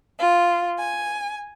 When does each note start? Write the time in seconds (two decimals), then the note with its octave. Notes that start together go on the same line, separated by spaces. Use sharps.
0.20 F4
0.79 G#5